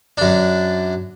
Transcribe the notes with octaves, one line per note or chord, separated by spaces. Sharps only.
F#2 D4